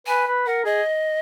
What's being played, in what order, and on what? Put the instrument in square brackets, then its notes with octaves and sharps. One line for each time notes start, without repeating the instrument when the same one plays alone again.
[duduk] B4 [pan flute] G#5
[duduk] B4
[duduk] A#4 [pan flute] F#5
[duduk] G#4 [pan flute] D#5